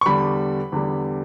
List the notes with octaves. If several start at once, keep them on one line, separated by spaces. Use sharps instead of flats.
C#6
E2 D3 G3 B5
E2 D3 G3